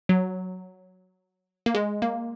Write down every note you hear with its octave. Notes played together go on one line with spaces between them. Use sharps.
F#3
A#3
G#3
A#3